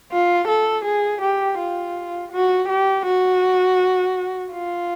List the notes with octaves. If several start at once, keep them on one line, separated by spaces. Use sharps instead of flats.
F4
A4
G#4
G4
F4
F#4
G4
F#4
F4